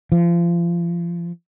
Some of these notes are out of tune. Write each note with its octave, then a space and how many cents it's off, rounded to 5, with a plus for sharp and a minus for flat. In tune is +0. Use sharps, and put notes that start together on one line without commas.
F3 -30